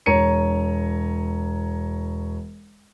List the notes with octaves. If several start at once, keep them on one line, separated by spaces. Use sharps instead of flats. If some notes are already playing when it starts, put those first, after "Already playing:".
E1 C#5 A#5 C#7 D#7